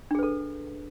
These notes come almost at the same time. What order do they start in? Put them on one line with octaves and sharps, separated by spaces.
D4 G#4 B4 A4